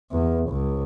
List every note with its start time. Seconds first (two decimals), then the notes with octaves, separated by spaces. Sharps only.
0.13 E2
0.50 C#2